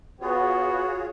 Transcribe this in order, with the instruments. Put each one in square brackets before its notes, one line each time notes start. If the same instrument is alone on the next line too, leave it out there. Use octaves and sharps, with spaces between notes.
[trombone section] B3 [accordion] F4 G#4 C#5 [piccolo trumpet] F#4